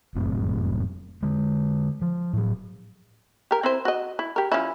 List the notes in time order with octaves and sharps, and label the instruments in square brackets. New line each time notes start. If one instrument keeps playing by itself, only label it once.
[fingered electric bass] F1 F#2 A2 C4
D3 G#3
F3
A2 F#3
[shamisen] G4 A#4
C4 E4 C5
F#4 D#5
E4
G4 A#4
F3 C#4 E4